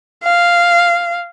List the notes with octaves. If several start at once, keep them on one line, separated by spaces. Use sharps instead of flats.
F5